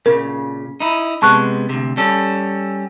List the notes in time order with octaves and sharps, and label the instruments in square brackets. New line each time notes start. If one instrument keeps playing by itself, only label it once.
[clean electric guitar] A#2 C#3 [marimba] A#4
[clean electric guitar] D#4 E4
[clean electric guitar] C3 G#3 B3 [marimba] A5 C#6 F#6
[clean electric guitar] D2 C3
G3 C#4 A4